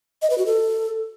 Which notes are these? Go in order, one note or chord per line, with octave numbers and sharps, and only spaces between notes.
D#5
B4
F#4
A4